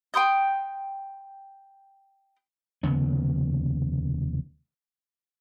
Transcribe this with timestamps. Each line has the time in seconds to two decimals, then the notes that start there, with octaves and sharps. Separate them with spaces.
0.14 G5 C6 D#6 G6
2.83 F1 D#2 C#3 B3